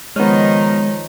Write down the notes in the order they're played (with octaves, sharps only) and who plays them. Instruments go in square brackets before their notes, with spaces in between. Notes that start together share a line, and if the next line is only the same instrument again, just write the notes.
[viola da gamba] D#3 F3 D#4 [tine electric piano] G#3 [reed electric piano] B3 F6 [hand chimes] C#5